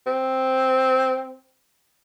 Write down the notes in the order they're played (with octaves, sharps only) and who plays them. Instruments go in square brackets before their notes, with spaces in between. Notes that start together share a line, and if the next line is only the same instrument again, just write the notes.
[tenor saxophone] C4